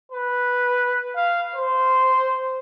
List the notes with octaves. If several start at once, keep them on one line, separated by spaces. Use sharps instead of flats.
B4
F5
C5